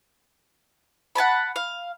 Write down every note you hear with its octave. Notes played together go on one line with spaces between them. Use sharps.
F#5 G#5 A5 B5
F5